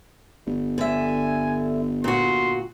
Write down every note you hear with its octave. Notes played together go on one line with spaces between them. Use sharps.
G1
D3 E5 G#5
A#2 F#4 C6